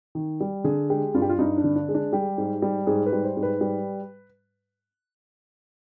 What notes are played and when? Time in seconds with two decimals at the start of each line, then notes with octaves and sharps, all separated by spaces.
0.15 D#3
0.40 G3
0.64 D3 G#4
0.90 G#3 G4
1.14 G2 F4
1.22 G4
1.29 F4
1.39 G2 D#4
1.58 D4
1.64 D3
1.76 D4
1.89 G#3
1.95 D4
2.13 G3 G4
2.38 G#2
2.62 G3
2.87 G#2 G#4
3.06 B4
3.13 G3
3.24 C5
3.37 G#2
3.43 B4
3.61 G3